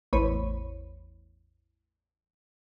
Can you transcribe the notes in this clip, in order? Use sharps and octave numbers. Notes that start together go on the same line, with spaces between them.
A1 E2 C5 C#5 B5 D#7